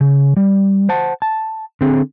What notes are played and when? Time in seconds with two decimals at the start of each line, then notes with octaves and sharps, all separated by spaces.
0.01 C#3
0.37 G3
0.89 C5 F#5 A5
1.22 A5
1.81 D3 C4 G#4